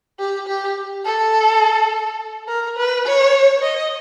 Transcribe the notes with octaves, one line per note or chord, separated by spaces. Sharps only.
G4
G4
A4
A#4
B4
C#5
D#5